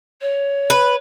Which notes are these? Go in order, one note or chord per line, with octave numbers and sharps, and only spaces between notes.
C#5
B4